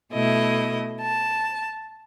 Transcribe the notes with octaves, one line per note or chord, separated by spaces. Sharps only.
B2 A3 E4 D#5
A5